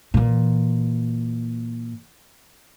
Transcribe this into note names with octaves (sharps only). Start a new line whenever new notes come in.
A#2 E3